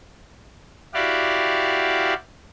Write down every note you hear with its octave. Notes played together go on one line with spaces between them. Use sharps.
E4 F#4 G4 D5 F5